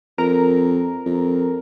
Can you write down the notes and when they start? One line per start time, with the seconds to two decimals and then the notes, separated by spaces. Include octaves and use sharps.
0.18 F2 A#4
1.06 F2